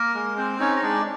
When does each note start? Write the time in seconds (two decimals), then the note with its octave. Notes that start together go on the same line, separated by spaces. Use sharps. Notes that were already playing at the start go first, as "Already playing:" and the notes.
Already playing: A#3 A#4
0.14 G#3
0.37 C4 C5
0.59 C#4 D#4 C#5
0.76 D#5
0.82 G#3 D4 D5